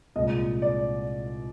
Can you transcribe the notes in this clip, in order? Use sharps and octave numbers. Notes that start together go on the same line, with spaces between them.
C2 A#2 G#3 D#5
D5